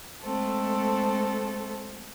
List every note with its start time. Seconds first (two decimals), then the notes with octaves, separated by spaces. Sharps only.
0.22 G#3 A3 C4 A4